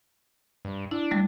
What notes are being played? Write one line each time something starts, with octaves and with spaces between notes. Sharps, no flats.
G2
D4 E4
G3 A3